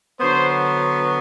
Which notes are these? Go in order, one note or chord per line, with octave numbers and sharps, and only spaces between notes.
D3 F#3 B3 C5